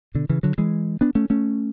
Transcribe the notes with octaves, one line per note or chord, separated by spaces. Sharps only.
B2 D3
C#3 E3
D3 F#3
E3 G#3
B3 D4
A3 C#4
A3 C#4